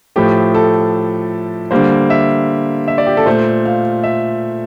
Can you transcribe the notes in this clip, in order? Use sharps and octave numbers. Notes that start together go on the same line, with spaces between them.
A2 F3 A3 G4
A4
D3 G3 A#3 C5
E5
E5
D5
G4
A4
A#2 A3 C5
F5
E5